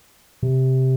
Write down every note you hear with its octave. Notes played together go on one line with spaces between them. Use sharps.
C3